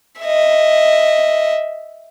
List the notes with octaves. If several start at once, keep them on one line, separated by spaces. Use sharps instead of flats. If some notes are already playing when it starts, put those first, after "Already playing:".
D#5 E5